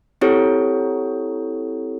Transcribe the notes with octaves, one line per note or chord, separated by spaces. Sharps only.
C4 E4 G4 A4 C#5